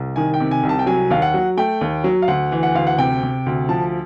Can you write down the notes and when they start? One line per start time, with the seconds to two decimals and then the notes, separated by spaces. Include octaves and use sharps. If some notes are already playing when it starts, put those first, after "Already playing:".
Already playing: C2
0.16 D#3 G#5
0.34 G5
0.40 C3
0.51 G#5
0.63 C2
0.69 A5
0.79 G5
0.86 F#3 G#5
1.10 D#2 F5
1.22 F#5
1.34 F#3
1.57 A3 G5
1.81 D#2
2.04 F#3
2.22 F5
2.28 D2 F#5
2.52 E3
2.63 F#5
2.75 D2 F5
2.87 F#5
2.98 C3 G5
3.23 C3
3.46 D2
3.69 F3 A5